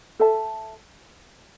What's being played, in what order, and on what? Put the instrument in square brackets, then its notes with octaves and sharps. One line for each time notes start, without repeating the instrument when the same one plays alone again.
[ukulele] A4 E5 A5